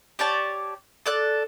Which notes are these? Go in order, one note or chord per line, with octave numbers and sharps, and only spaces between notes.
G4 C#5 D5 A5
A4 D5 F#6